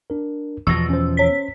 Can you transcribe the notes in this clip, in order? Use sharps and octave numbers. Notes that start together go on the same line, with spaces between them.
D4 A#4
E2 B2 F3 C#6 E6 A#6
C#4 C5
C#5 B6